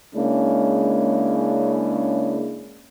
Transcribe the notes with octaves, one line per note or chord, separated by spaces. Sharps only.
C#3 G#3 A#3 C#4 D4 E4